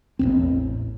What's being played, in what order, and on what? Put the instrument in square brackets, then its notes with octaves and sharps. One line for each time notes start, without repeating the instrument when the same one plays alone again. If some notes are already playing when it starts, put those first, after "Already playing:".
[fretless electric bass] A1 E2 G2 C4